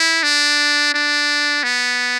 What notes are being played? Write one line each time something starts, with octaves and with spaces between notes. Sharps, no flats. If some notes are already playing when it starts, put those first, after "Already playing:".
Already playing: E4
D4
D4
B3